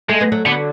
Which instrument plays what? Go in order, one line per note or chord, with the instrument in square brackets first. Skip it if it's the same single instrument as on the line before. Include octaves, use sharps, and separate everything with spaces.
[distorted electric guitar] G#3 [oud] A3
[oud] B3
F#3 A3
[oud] D3 F#3 [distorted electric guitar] B3